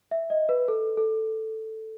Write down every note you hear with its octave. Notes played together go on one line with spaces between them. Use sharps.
E5
D#5
B4
A4
A4